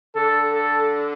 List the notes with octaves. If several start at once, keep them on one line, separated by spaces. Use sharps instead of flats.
D3 A4
A4